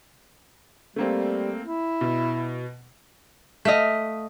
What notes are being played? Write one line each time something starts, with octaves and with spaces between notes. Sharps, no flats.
G3 A3 A#3 C4
E4
B2
A3 D#5 F5 B6